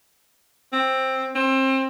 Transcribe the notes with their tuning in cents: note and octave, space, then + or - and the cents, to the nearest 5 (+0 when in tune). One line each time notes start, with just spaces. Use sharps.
C4 +10
C4 +30